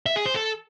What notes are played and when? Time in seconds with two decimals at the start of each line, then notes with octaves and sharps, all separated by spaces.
0.06 E5
0.16 G#4
0.26 C5
0.35 A4